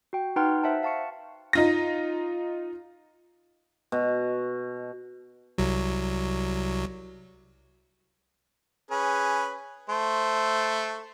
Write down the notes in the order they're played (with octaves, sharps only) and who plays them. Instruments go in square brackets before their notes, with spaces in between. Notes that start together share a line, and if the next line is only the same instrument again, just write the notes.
[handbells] F#4 G5
D#4 B4 F#5 G5 C6 F6
C5 E5 F#5 A5
F5 A5 C#6 C#7
[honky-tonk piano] D#4 F4 A#6
[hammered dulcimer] B2
[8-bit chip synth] C2 F#3
[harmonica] C#4 G#4 B4
A3 C5